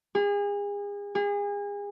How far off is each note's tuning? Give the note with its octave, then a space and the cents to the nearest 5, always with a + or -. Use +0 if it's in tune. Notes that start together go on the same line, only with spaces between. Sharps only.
G#4 -35
G#4 -35